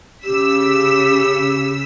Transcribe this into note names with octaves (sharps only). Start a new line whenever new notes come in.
C#3 G4 E6 B6